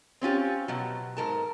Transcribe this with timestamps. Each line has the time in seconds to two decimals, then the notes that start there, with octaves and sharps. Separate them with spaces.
0.21 C4 C#4 F4 G4
0.68 B2 F#3
1.17 G#2 A#4 A5